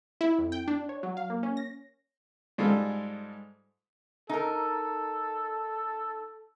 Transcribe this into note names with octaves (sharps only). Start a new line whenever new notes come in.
E4
F2
G5
D4
C#5
F#3
F5
A#3
C#4
A#6
G#2 G3 G#3 F4 A4
D#4 A4 A#4